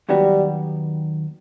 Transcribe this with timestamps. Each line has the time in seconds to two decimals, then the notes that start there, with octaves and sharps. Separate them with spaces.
0.09 D#2 D#3 F#3 G3 B3 F#4